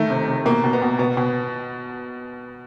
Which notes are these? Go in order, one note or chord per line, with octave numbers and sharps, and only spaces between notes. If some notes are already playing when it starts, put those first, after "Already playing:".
Already playing: D#3 A3
C3
C3
B2 A#3
B2
B3
B2
B2 B3
B2